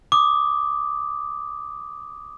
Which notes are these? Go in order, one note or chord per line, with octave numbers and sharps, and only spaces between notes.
D6 D#6